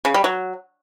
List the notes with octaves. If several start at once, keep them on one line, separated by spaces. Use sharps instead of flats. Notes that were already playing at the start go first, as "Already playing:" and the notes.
C#3
G3
F#3